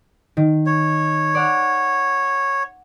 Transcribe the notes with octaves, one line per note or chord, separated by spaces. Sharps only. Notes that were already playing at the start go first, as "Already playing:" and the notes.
D#3
C#5
D5 F#5 F6